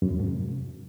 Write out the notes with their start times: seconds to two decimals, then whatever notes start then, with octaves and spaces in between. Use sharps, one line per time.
0.02 F#2
0.11 E2
0.20 G#2
0.29 C3